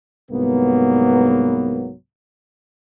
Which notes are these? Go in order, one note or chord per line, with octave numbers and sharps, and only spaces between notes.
C2 G#2 F#3 A#3 B3